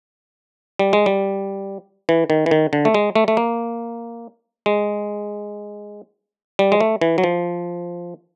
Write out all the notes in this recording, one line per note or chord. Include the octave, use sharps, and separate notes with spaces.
G3
G#3
G3
E3
D#3
E3
D#3
D3
A3
G#3
A3
A3
A#3
G#3
G3
G#3
A3
E3
F#3
F3